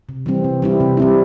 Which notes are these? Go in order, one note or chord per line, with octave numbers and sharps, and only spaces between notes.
C3
E3 G3 C4
C3
G3 C4 E4
C3
G3 C4 E4